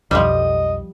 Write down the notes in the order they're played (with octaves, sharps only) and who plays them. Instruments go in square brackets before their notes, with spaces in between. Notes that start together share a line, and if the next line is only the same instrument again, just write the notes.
[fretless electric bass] B1 F2 [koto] F3 G3 [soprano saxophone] D#5